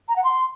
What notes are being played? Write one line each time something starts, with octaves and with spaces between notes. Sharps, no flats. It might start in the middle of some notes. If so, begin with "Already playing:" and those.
A#5
F#5
C6